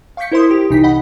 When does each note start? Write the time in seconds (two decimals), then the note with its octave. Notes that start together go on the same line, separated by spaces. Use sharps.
0.17 F5 C#6 D6 G6 B6 C#7
0.32 E4 A#4 C5 E5 C6 D#6
0.51 G4
0.70 C2 C3 E3 D#4 B6
0.84 D#5 F#5 B5